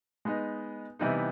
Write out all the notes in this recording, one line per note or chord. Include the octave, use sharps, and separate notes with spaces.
G#3 B3 D#4
C3 E3 G3 B3 D#4